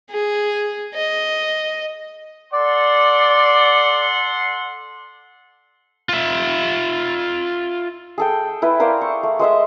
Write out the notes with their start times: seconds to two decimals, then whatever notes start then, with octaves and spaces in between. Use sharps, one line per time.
0.10 G#4
0.94 D#5
2.53 A4 D5 F#5 C6
6.09 F4 E5
8.18 G#4 A4 G5
8.62 E4 B4
8.80 A#4 C5 D5 F5
9.01 C#6
9.23 A3
9.39 G#3 C5 D#5 E5